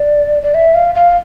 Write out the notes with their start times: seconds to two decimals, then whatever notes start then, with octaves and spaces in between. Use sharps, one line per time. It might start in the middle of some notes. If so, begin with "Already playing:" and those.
Already playing: D5
0.43 D5
0.54 E5
0.75 F5
0.95 F5